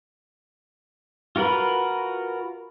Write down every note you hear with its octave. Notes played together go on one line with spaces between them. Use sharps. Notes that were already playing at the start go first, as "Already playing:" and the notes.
F4 F#4 A#4 B4 B5